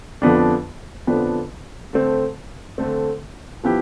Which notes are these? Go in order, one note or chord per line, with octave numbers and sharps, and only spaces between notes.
F2 D3 F3 B3 D4
F2 D3 F3 B3 D4
D3 A3 C4
D3 A3 C4
F3 B3 E4 G4